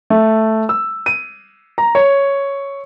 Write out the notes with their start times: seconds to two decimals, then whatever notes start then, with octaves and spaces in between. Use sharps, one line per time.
0.10 A3
0.69 E6
1.06 D#7
1.78 A#5
1.95 C#5